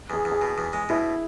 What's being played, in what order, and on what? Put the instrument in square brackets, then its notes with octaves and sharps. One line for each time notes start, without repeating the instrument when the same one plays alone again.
[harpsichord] E2 [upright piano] G#4
[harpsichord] E2
[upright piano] G#4
[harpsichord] B2
E2
G#3
[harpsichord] B2 [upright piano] E4